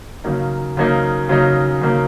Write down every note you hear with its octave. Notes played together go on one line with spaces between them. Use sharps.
C#3 F#3 A#3 D#4
C#3 F#3 A#3 D#4
C#3 F#3 A#3 D#4
C#3 F#3 A#3 D#4